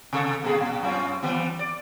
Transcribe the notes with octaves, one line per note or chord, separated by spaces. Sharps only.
C3 A4
G2 A#2 G#4
G2 A#2
F#2 C#4 F4
E3 G3 B3
D5